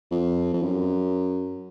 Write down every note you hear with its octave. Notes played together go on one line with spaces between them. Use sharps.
F2
F2
F#2